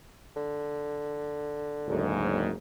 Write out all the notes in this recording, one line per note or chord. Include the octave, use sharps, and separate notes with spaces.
D3
F#1 D2 G#2